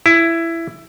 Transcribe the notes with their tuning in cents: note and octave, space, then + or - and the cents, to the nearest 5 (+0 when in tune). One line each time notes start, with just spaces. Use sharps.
E4 +15